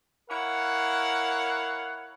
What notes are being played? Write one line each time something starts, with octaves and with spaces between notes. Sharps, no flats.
E4 A#4 C#5 F5 F#5